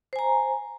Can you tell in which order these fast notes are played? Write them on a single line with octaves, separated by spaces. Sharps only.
C5 G#5 A#5